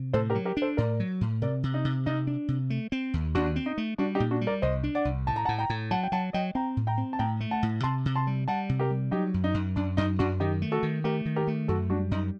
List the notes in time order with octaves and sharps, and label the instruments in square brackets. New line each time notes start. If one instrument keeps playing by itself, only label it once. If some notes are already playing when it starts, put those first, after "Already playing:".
Already playing: [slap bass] C3
[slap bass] A2 [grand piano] A4 C5
[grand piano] G4 A#4
[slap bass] F#3
[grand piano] G4 A#4
[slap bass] D4
[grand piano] A4 C5
[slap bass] A2 [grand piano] A#4 D5
[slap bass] F#3
A2
[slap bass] C3 [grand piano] A#4 D5
[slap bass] C3
[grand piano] D#4
[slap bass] C3
[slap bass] C3 [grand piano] D#4
[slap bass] D4
C3
A3
C4
D#2
[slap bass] D#2 [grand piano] D4 F#4
[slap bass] C4
[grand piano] D#4
[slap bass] A3
[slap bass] G3 [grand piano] D4 F#4
[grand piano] D#4 G4
[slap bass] A#2
[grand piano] D4 F#4
[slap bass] G3
[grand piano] A#4 D5
[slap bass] C2 [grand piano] C5 D#5
[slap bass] D4
[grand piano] D5 F#5
[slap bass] C2
[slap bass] A2 [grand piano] A5
[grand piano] A#5
F#5 A5
[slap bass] A2
[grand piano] G5 A#5
[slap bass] A2
[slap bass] F#3 [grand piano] F#5 A5
[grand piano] G5
[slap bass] F#3 [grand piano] F#5 A5
[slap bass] F#3 [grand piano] D#5 G5
[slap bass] C4 [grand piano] G5 A#5
[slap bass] A2
[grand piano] G5 A#5
[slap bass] C4
[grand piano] A5
[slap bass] A2 [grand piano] G5 A#5
[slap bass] A3
[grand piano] F#5 A5
[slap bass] A2
[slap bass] C3 [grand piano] A5 C6
[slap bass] C3
[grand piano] A5 C6
[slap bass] G3
[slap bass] G3 [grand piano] F#5 A5
[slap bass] C3
[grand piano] G4 A#4
[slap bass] G3
[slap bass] F#3 [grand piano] D#4 G4
[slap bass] F#2
[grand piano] D#4
[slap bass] F#2
[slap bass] F#2 [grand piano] D4
[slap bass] F#2 [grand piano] D#4
[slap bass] F#2 [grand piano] D4 F#4
[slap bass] D#3 [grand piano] D#4 G4
[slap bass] A3
[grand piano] F#4 A4
[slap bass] D#3
[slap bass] A3 [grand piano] G4 A#4
[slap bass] D#3
[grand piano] G4 A#4
[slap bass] A3
[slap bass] F#2 [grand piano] F#4 A4
[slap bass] G3 [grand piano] D4 F#4
[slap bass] F#2 [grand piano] D#4